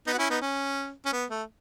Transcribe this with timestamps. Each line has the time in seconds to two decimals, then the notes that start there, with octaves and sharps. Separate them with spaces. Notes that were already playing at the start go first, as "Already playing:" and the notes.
0.07 B3 D#4
0.13 F#4
0.18 C#4 E4
0.30 B3 D#4
0.42 C#4
1.05 C#4
1.12 B3
1.30 A3